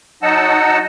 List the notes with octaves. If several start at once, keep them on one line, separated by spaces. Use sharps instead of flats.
F#3 D#4 D#5 F#5 A5 E6